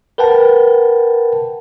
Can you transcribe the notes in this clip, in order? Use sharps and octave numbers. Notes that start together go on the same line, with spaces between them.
A#4 B4 F#5 G5 A5